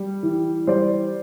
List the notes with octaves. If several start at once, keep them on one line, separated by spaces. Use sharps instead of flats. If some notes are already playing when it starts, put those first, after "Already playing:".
Already playing: G3
E3
G3 C5 D5